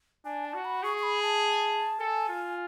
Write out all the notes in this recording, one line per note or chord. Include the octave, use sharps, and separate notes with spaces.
D4 G#5
A5
F#4
B5
G#4 C#6
C#6
B5
A5
A4 G#5
F4